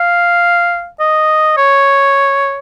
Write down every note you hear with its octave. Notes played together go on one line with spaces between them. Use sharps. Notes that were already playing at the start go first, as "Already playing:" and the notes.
Already playing: F5
D#5
C#5